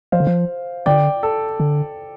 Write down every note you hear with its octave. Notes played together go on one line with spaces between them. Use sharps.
F3 C5 F5
D3
F3
D3 D5 G5
A4
D3